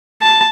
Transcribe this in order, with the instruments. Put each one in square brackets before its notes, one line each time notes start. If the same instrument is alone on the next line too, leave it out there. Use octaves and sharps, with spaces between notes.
[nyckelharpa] A5